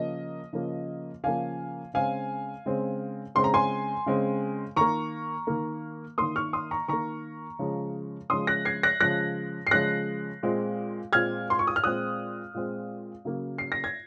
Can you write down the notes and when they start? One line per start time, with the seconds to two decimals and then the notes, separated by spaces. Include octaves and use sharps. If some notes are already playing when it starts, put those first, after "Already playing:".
Already playing: C#3 F3 A#3 D#5
0.53 C#3 F3 A#3
1.24 C#3 F3 A#3 F5 G#5
1.94 C#3 G#3 C4 F5 G#5
2.66 C#3 G#3 C4
3.35 C#3 G#3 C4 C6
3.44 A#5
3.54 G#5 C6
4.06 C#3 G#3 C4
4.76 D#3 A#3 A#5 C#6
5.47 D#3 A#3
6.18 D#3 A#3 C6 D#6
6.36 C#6 F6
6.53 C6 D#6
6.71 A#5 C#6
6.88 D#3 A#3 A#5 C#6
7.59 C#3 F3 G#3
8.30 C#3 F3 G#3 C6 D#6
8.47 F#6 A#6
8.65 G#6 C7
8.83 F#6 A#6
9.00 C#3 F3 G#3 F#6 A#6
9.67 C7
9.71 C#3 F3 G#3 F#6 A#6
10.43 A#2 G#3 C4
11.13 A#2 G#3 C4 F6 G#6
11.50 C6
11.59 C#6
11.67 D#6
11.76 F6
11.84 A#2 G#3 C4 D#6 F#6
12.54 A#2 G#3 C4
13.25 C#3 F#3 A#3
13.58 C7
13.72 A#6
13.84 G#6